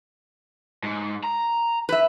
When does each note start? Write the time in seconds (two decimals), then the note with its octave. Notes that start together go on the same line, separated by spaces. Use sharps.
0.83 G#2
1.24 A#5
1.89 B4 E5